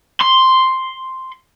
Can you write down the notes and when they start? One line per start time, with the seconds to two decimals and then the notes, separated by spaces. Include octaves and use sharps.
0.21 C6